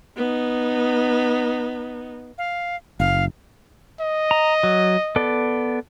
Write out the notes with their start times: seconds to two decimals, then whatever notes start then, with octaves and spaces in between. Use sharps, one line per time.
0.17 B3 D#4
2.38 F5
3.00 F#1 F5
4.01 D#5
4.31 A#5
4.63 F#3
5.16 B3 A4 D5